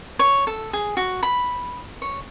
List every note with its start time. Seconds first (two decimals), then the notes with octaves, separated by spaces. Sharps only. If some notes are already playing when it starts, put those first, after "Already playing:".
0.19 C#5
0.47 A4
0.73 G#4
0.97 F#4
1.23 B5
2.02 C#5